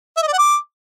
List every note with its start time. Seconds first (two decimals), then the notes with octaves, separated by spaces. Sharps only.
0.17 E5
0.22 D#5
0.28 D5
0.33 F#5
0.38 D6